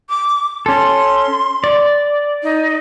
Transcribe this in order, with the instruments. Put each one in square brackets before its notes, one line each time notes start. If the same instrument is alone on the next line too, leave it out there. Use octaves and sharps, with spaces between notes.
[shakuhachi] D6
[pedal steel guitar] C#4 A4 [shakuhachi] C6
[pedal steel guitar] D5
[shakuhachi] D#4